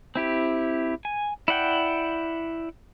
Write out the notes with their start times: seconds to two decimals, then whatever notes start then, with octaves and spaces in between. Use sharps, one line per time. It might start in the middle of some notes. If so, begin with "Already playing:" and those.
0.15 C4 E4 G4
1.05 G#5
1.48 E4 D5 F#5 G5